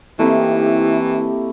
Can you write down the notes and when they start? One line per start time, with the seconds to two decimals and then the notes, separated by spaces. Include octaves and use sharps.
0.19 E3 A3 A#3 C4 D#4 E4 G4 A#4